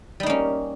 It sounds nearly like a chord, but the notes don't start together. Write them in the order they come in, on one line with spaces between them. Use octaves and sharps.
G3 D#4 A#3 C#4